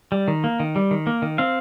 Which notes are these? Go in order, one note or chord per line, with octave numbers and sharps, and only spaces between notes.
G3
D#3
A#3
D#3
G3
D#3
A#3
D#3
C4 F5